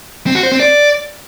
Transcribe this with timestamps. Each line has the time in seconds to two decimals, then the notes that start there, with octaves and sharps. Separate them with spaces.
0.27 C4
0.35 F#4
0.43 C5
0.52 C4
0.60 D5